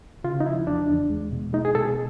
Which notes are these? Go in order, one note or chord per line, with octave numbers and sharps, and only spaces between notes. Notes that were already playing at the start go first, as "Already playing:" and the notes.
C#3 F4
D#4
F3 E4
E2 D4
E2
G#3
B2
G#3 D#4
G#4
B2 A4
G#4